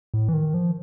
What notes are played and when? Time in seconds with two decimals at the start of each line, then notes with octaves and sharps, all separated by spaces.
0.14 A2
0.28 E3
0.33 D#3
0.54 F3